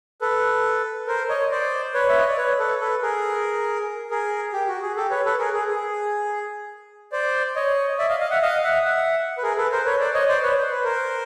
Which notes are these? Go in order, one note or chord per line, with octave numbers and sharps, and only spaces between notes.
A4 B4
A#4 C5
C#5 D#5
C5 D5
B4 C#5
E5
D#5
D5
B4 C#5
A4 B4
A4 B4
G#4 A#4
G#4 A#4
G4
F#4
G#4
G4 A4
B4 C#5
A4 B4
G#4 A#4
G#4
G#4
C5 D5
C#5 D#5
D5 E5
D#5 F5
D#5 F5
E5 F#5
D#5 F5
E5 F#5
E5 F#5
B4
G#4 A#4
A4 B4
A#4 C5
B4 C#5
C5 D5
C#5 D#5
C5 D5
B4 C#5
C5
B4
A#4 C5